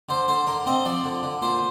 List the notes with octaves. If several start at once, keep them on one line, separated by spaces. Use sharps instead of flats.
D3 C5
D3 C5
D3 A#4
C4 D#5
F3 D5
D3
D3
A#2 C5